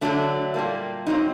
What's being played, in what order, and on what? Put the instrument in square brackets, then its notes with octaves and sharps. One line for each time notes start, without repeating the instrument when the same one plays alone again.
[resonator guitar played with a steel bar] D3 F#3 A3 D4
A#2 G3 A#3
G2 F#3 C4 D#4